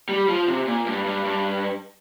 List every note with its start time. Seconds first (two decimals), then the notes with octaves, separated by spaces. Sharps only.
0.09 G3
0.28 F3
0.48 C3
0.67 A#2
0.86 G2
1.06 G2
1.25 G2